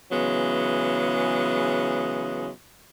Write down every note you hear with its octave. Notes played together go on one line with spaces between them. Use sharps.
C#3 E3 F#3 G#3 B3